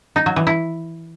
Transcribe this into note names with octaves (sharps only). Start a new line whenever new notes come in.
D#4
F#3
E3
E4